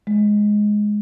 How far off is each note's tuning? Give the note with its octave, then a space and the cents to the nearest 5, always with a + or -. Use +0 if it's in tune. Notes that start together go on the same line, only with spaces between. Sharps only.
G#3 +5